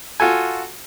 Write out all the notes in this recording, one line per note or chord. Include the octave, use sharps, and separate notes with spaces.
F4 F#4 A4 G#5